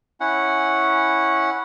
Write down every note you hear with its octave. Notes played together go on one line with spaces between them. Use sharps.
C#4 E4 F#5